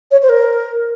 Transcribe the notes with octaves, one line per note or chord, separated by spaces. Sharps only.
C#5
C5
A#4